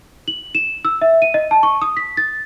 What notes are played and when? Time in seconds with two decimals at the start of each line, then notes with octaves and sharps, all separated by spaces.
0.28 F#7
0.55 E7
0.85 E6
1.02 E5
1.22 D#7
1.34 D#5
1.51 A5
1.63 C#6
1.82 D#6
1.97 B6
2.17 A6